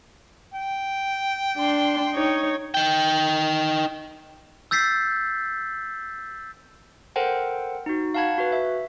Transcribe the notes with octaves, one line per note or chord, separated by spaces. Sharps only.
G5
D4 C6
D#4 C#5
D#4 G5
E6 G6 A6 B6 C7
A4 A#4 C5 F#5 G5
D#4 F#4
F5 F#5 A5 B5 G#6
F#4 B4
E5